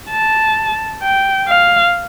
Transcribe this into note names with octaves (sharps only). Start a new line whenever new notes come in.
A5
G5
F5